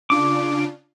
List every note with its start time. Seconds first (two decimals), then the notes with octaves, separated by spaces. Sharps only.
0.10 C#3 D4 F4 D6